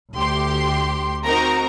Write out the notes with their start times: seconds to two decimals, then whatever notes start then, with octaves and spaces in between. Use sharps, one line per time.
0.14 D2 G4 C6
1.25 C4 D#4 F#4 A#4 A#5